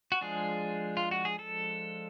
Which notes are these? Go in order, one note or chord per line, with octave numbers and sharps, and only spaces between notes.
F#4
F3 G#3 D4 G#4
F4
F#4
G#4
A4